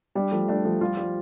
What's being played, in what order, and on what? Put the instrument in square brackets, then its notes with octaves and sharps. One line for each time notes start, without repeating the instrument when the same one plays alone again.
[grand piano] G3 [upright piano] D4
[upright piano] F3 [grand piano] A3
[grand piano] A3 [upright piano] D4
[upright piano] F3 [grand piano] A3
[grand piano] G3 [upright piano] F4
[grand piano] F3 [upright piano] G3